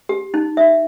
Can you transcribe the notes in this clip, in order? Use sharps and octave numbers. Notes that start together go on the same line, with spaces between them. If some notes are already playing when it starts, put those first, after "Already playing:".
G4
D#4
E5